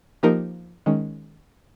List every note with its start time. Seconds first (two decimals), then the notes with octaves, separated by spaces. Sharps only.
0.23 F3 A#3 D#4 G4 A#4
0.86 D#3 G#3 C#4